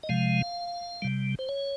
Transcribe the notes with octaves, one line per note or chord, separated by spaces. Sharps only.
D#5
C3 F3 G#3 F5
C3 G3
C5
C#5